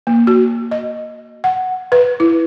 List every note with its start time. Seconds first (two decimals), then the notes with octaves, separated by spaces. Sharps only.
0.07 A#3
0.27 F#4
0.71 D#5
1.44 F#5
1.92 B4
2.20 E4